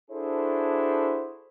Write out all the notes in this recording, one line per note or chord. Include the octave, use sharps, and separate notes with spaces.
D4 E4 F#4 G#4 A4 C5